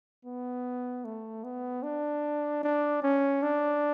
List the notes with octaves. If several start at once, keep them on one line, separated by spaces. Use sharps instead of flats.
B3
A3
B3
D4
D4
C#4
D4